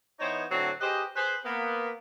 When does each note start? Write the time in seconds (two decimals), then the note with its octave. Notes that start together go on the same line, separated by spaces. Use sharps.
0.19 E3 B3 D#4 C5 C#5
0.50 A2 D3 F#3 C4 F#4
0.81 G4 G#4 B4 C5 D#5
1.15 G#4 B4 C5
1.45 A#3 B3